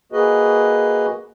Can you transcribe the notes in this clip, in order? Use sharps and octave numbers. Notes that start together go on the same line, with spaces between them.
A#3 F#4 G#4 B4 D#5